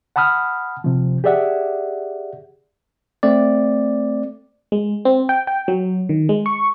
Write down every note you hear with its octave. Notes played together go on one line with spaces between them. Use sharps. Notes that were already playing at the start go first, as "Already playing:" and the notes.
F#5 A5 B5 D#6 F6
C3 F3
G4 G#4 D5 E5 F#5
A3 C4 D5
G#3
C4
G5
G5
F#3
D#3
G#3
C#6